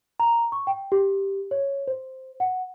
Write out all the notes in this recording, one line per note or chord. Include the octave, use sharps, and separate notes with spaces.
A#5
C#6
G5
G4
C#5
C5
F#5